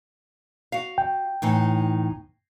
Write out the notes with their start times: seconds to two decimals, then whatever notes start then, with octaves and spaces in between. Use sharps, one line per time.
0.72 F#4 F5
0.98 G5
1.42 A2 E3 D#4